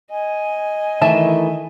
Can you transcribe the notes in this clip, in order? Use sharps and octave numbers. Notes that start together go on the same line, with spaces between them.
D#5 G#5
D#3 E3 A3 E5 A5